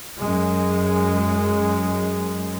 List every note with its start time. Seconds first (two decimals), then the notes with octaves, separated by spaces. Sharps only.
0.19 F#2 G#3